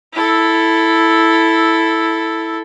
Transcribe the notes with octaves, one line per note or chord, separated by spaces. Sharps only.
E4 A4